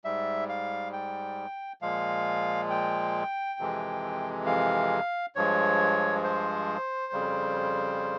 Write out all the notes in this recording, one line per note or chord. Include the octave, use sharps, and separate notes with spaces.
G#2 G3 E5
F5
G5
A#2 F3 G#3 F5
G5
F2 C3 E3 G#3
F5
G2 F3 G#3 C#5
C5
F2 C#3 G3